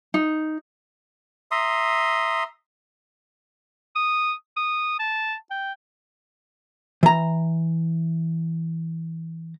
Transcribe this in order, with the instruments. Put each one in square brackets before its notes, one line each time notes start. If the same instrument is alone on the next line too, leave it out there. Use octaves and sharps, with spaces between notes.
[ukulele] D#4
[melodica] E5 A#5 C6 D#6
[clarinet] D#6
D#6
A5
G5
[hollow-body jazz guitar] E3 A#5